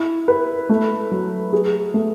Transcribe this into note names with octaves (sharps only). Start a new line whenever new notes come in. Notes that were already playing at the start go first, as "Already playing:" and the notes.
Already playing: E4
B4
A3
F#3
G#4
A3